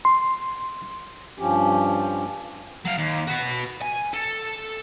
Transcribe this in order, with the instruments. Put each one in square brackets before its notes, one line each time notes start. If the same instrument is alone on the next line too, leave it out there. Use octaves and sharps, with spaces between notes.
[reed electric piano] C6
[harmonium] G2 F3 C#4 G4
[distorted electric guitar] F#3 F5
D#2
F#4 B4
G#5
A4